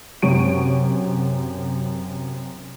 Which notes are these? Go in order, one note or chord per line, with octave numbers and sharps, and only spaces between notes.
F#2 C3 C#6 D7 D#7